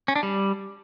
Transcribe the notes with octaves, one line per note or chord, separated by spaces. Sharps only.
C#4
D4
G3